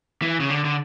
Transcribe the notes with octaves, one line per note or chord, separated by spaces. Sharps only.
E3
C#3
D3
D3